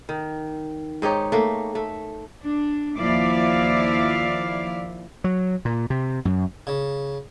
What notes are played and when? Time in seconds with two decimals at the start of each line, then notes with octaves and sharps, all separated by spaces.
0.09 D#3
1.02 G#2 D#4 G4 C#5
1.32 A3 A#3
1.75 A3
2.44 D4
2.98 D#2 F3 E4 D5 F5
5.24 F#3
5.65 A#2
5.90 C3
6.25 F#2
6.67 C#3